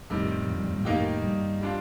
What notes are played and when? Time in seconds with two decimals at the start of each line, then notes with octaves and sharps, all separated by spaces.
0.10 F2 A2 C3 D#3 G3
0.48 F2 A2
0.58 G2
0.66 F2 A2
0.76 G2 A#2
0.85 F2 A2 D#3 A#3 D#4 G4
1.23 G2
1.61 G3 D4 F4